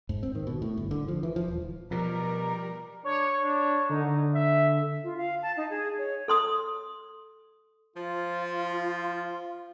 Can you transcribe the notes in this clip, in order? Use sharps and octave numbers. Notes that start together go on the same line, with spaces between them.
G#2
C4
D#3
B2
A2
G1
D3
F3
E3
F3
D#1
B2 F3 G3 A#4 A#5
D4 C#5
D4
D3 D#4
E5
F4
F5
A5
D#4
G#4
C#5
A4 C6 D#6
F3 F4 F5